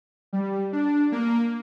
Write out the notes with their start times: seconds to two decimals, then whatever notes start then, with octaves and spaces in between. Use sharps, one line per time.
0.33 G3
0.73 D4
1.12 A#3